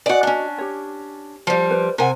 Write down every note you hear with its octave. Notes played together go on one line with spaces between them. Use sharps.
F#4 D5 D#5 F#5 G#5
C#4 D4
G4 C#5
F3 G3
B4 C5
C3 A#4 F5 F#5 G#5